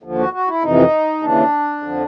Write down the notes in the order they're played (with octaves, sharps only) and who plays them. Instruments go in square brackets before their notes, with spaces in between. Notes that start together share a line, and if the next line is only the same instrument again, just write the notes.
[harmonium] D#2 D3 F3
F#4
F#4
E4
F2 C3 E3 D#4
D#2 C#3 E3 D4
F2 D3 F3